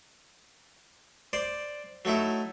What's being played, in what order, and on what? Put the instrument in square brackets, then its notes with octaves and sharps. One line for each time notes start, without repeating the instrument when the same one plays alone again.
[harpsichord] C5 D5
F#3 A3 D#4 E4